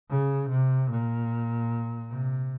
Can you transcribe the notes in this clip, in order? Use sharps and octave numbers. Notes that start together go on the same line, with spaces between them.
C#3
C3
A#2
C3